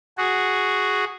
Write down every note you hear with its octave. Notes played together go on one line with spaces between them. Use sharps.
F#4 G#4